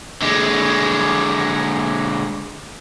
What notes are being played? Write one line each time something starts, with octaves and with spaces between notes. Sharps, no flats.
D3 G#3